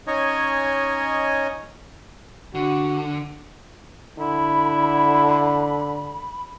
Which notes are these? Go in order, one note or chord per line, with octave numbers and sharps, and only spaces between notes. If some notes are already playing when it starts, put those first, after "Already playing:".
C#4 D#4 C#5 D#5 G#5
D3 F#4
D3 E4 B5